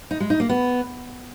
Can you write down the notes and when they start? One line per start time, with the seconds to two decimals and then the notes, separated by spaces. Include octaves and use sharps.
0.11 D#4
0.20 G#3
0.30 D#4
0.40 A#3
0.49 B3